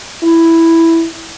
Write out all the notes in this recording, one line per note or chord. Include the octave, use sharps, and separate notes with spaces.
E4